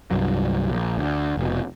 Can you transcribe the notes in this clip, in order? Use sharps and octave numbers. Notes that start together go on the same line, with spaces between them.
C2 G2 F#3
A#1
D2
F1 B2